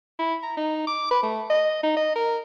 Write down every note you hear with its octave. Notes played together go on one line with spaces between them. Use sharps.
E4
A#5
D#4
D6
B4
A3
D#5
D#4
D#5
A#4